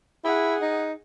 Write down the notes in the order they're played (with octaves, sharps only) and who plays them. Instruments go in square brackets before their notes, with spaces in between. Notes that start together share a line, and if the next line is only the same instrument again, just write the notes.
[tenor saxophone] E4 [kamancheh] G#4 F#5
[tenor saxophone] D#4